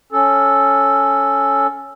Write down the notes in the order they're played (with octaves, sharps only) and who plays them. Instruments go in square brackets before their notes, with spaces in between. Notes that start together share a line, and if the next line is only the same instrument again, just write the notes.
[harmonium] C#4 A4